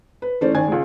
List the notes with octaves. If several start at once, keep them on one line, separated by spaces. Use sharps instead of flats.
B4
E3 A3 C#4 C5 D5
D#3 D5 G#5 G#6
C#2 G#3